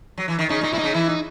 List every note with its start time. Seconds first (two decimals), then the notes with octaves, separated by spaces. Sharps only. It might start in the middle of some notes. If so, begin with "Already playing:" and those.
0.18 F#3
0.28 E3
0.39 D#3
0.49 C#3 D#4
0.61 A#2
0.64 D#4
0.73 A#2 E4
0.79 C#3 D#4
0.94 E3 E4
1.09 D#4